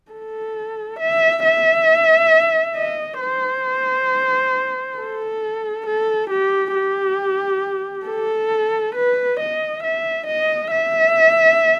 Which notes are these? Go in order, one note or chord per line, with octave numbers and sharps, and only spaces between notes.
A4
E5
E5
D#5
C5
A4
A4
G4
G4
A4
B4
D#5
E5
D#5
E5